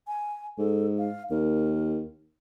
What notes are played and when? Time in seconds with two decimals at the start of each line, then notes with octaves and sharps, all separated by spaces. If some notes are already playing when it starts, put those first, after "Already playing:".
0.08 G#5
0.58 G#2 A4
0.98 F5
1.31 D#2 A#4